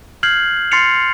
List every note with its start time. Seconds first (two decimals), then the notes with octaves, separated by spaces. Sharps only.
0.23 F6 G6 G#6 C7 F#7
0.71 C6 F6 A6 C7 C#7 F7